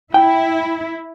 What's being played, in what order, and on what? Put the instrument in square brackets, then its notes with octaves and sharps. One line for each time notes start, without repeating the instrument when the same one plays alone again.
[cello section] E4 [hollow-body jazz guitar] G5